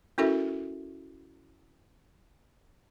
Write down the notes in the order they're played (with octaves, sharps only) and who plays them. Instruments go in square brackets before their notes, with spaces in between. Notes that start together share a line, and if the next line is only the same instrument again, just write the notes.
[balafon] C#4 E4 F#4 A4 A#4 E5